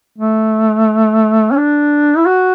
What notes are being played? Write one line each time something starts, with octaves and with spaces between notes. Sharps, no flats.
A3
C#4
D4
E4
F#4